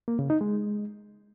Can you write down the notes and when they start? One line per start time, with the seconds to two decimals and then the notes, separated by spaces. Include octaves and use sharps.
0.08 A#3
0.19 C#3
0.30 D#4
0.41 G#3